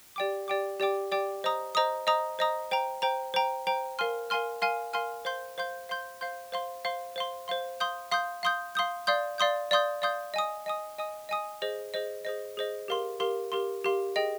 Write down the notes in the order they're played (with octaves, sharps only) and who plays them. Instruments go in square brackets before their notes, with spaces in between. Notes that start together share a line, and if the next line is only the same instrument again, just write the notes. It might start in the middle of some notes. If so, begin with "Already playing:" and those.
[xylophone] G4 D5 G5 D6
G4 D5 G5 D6
G4 D5 G5 D6
G4 D5 G5 D6
C5 D#5 A#5 D#6
C5 D#5 A#5 D#6
C5 D#5 A#5 D#6
C5 D#5 A#5 D#6
C5 G5 A#5
C5 G5 A#5
C5 G5 A#5
C5 G5 A#5
A#4 F5 G#5 C6 F6
A#4 F5 G#5 C6 F6
A#4 F5 G#5 C6 F6
A#4 F5 G#5 C6 F6
C5 F5 C6 G6
C5 F5 C6 G6
C5 F5 C6 G6
C5 F5 C6 G6
C5 F5 C6
C5 F5 C6
C5 F5 C6
C5 F5 C6
F5 C6 D#6 G6
F5 C6 D#6 G6
F5 C6 D#6 G6
F5 C6 D#6 G6
D5 F5 C6 D#6 G6
D5 F5 C6 D#6 G6
D5 F5 C6 D#6 G6
D5 F5 C6 D#6 G6
D#5 G#5 D#6
D#5 G#5 D#6
D#5 G#5 D#6
D#5 G#5 D#6
G#4 C5 D#5
G#4 C5 D#5
G#4 C5 D#5
G#4 C5 D#5
G4 A#4 F5 C6
G4 A#4 F5 C6
G4 A#4 F5 C6
G4 A#4 F5 C6
G#4 D#5 G5